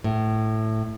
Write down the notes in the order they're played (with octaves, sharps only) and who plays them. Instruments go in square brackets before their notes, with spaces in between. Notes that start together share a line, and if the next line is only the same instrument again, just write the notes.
[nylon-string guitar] A2